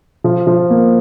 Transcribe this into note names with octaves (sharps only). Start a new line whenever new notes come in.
F3
F3
A#3